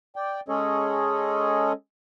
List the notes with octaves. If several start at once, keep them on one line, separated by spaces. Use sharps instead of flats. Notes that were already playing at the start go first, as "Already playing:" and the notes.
D5 G5
G#3 C#4 G#4 A4 C#5 D#5